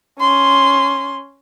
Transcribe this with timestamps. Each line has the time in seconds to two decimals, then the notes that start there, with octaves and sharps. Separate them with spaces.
0.20 C#4 C6